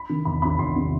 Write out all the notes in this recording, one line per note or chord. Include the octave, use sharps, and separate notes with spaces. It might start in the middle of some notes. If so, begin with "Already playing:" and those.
Already playing: B5
C3 D#3
E2 B5
C3 D#3 B5
E2 C6
C3 D#3